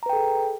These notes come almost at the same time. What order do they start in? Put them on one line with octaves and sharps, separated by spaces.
A#5 B4 G5 A4 G#4